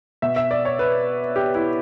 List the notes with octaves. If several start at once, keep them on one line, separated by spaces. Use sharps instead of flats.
B2 E5
E5
D5
C#5
B4
G4
E4